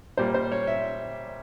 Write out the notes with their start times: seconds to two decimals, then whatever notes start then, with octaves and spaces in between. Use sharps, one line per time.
0.17 A#2 G3 A#3 C5
0.34 C5
0.52 C#5
0.67 E5